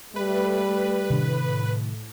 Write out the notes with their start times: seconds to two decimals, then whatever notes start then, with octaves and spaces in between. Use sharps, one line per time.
0.16 G3 A3 B4
1.10 A2 C3 D#3 D4